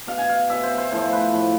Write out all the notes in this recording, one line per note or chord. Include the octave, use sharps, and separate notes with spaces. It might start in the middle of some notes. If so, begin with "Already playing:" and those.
B2 F5
G#5
F5
B2 E5
C5
C5
A2 F3 C5
B4
A2 F3